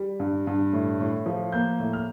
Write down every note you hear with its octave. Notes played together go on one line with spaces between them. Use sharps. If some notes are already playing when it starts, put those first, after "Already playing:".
Already playing: G3
G2
G2
A2
A2
F3
A#3 G6
A2
F6